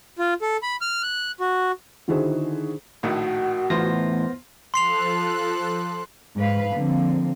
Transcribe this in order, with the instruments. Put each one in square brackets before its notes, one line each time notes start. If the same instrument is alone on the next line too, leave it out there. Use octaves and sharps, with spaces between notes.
[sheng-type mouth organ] F4
A4
B5
F6
F#6
F#4
[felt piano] D3 D#3 E4 F#4 G#4 C5
[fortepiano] A#1 A2 D#3 [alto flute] F#4
[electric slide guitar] E2 A2 [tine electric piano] B3 C5 A#6 [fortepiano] F4
[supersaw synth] F3 A4 F#6 [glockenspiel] C6 C7 F7
[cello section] G#2 B4 F5
D3 F3 A#3 C4